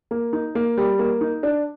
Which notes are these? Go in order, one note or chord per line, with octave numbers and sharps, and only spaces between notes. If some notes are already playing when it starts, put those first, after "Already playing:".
A#3
D#4
A#3
G3
A#3
D#4
D4